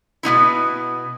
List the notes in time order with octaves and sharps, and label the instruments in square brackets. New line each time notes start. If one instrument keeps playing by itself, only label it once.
[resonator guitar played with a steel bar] B2 B3 D#4 E4